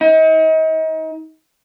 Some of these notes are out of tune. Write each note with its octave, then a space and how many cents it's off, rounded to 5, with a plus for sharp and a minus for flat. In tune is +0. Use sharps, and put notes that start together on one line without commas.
D#4 +35